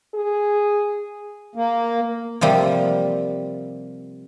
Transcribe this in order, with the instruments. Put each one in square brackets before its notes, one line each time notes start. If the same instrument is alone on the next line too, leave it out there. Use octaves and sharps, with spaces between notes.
[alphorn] G#4
[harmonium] A#3
[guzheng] C3 F3 G3 A#3